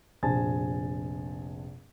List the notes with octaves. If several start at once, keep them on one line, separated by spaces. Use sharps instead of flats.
F1 A#1 C5 G#5 A5 A6